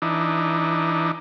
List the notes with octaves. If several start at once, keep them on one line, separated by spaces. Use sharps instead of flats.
E3 D4 D#4